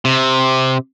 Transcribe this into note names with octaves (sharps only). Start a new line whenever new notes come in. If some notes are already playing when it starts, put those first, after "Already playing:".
C3